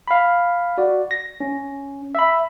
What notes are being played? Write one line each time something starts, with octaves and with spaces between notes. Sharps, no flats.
F5 B5
F#4 D5
A#6
C#4
E5 B5